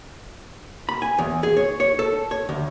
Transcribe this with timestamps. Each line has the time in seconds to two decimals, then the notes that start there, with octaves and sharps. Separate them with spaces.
0.89 B5
1.02 G#5
1.18 E2
1.43 G#4
1.57 C#5
1.80 C#5
1.99 A4
2.31 C#5
2.49 D2